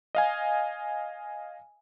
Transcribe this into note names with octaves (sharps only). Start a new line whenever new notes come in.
D#5 F5 G#5